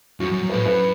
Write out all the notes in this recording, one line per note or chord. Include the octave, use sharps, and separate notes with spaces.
F#2 F#4
F#2
F#2
A2 B4
F#2 B4